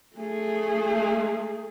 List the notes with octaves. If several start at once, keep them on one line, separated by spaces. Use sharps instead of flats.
A3 G#4